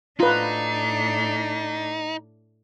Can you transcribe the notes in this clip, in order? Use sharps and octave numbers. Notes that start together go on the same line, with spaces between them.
A2 D4 D#4 F4 B4